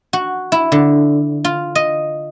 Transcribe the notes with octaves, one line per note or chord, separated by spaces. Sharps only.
F#4
E4
D3
F4
D#5